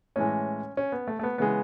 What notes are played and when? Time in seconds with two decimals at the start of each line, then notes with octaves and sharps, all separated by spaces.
0.16 A2 E3 G#3 C#4
0.77 C#4
0.92 B3
1.08 A3
1.19 A3
1.23 B3
1.38 C#3 E3 G#3 B3